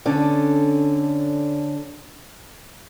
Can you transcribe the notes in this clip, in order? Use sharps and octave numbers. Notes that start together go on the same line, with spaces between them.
D3 C#4 D4 A4